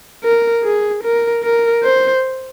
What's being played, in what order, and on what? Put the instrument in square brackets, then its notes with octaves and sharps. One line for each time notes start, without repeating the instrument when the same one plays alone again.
[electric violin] A#4
G#4
A#4
A#4
C5